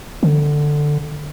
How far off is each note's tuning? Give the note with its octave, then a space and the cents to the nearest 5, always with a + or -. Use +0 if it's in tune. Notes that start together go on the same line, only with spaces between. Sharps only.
D3 +10